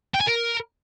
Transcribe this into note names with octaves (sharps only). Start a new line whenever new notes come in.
G5
G#5
A#4